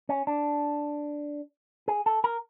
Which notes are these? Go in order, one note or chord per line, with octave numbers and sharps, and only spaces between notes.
C#4
D4
G#4
A4
A#4